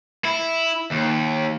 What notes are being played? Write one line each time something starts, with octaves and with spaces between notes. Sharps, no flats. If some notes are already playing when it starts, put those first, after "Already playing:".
E4
D#2